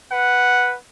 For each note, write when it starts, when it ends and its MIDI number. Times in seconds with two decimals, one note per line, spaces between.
0.11 0.75 71
0.11 0.75 78